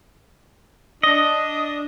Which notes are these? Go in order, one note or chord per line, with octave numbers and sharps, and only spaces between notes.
D4 D#5